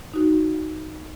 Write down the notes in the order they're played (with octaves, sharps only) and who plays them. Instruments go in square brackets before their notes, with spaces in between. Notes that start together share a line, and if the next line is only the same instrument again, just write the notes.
[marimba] D#4 F#4